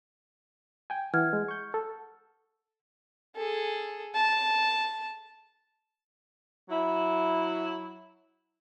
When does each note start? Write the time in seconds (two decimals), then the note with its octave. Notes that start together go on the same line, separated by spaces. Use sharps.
0.90 G5 G#5
1.14 E3 F#5 F6 G#6
1.33 G#3
1.48 C#6 G6
1.74 A4
3.36 G#4 A4
4.14 A5
6.69 F#3 E4